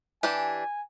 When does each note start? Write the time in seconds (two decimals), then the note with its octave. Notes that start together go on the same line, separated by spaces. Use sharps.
0.23 E3 D4 G4 G#5